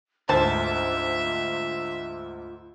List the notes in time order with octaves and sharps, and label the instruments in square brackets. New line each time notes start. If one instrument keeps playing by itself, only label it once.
[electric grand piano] D2 G#2 [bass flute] F4 [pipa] C5 A5 [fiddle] E5